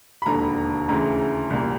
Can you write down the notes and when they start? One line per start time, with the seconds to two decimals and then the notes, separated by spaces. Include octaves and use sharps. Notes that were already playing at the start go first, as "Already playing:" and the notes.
0.22 B5
0.26 E1 D#2 D3 A#5
0.88 D2 C#3 E3 A#5
1.50 C2 A#2